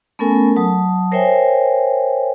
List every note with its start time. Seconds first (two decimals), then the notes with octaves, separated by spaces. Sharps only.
0.19 A3 B3 C#4 A4 A#4 G#5
0.56 F#3 A5 D#6
1.12 A#4 C5 C#5 E5 G5 G#5